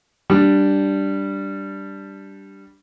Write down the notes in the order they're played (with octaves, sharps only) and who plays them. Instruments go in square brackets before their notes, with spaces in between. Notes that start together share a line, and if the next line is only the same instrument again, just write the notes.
[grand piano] G3 D4